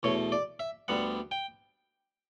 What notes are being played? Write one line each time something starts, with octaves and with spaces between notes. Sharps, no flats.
E2 B2 A3 C#5
D5
E5
D2 D3 G3 B3 F#5
G5